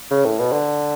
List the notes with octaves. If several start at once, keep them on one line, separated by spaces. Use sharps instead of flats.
C#3
A2
B2
D3